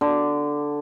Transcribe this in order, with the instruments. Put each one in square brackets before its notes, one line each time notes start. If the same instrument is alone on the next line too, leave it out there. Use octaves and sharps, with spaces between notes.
[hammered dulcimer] D3